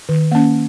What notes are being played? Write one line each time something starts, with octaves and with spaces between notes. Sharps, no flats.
D#3
A#3 C#4